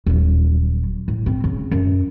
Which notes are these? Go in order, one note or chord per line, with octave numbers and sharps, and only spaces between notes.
D#1 F#3
A2
C4
C#3
F#2